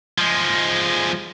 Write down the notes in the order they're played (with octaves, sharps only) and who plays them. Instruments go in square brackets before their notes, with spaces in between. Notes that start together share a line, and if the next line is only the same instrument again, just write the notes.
[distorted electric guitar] F3 G#3